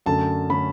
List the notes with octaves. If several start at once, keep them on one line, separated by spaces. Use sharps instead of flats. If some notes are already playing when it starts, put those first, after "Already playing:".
F#2 D3 A3 C#4 A5
D3 A3 C#4 B5